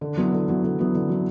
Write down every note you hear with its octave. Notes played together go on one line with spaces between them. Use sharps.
D3
F#3 B3 E4
D3
F#3 B3 E4
D3
F#3 B3 E4
D3
F#3 B3 E4